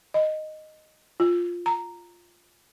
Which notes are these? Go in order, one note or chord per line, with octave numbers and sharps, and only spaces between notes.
D#5
F4
A#5